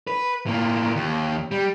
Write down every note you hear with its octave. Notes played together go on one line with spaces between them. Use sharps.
B4
A2 A#3
D#2
G3